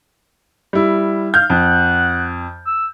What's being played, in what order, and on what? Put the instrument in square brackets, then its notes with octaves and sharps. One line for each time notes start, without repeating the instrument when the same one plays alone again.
[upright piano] G3 E4
[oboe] F5 [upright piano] F6 G6
[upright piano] F2 [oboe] F#5
[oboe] E6